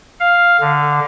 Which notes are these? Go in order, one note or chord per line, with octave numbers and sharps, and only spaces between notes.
F5
D3